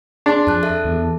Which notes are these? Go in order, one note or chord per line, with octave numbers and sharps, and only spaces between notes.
D4 G#4 C6
F2 A5 F#6
A4 E5 A5
E2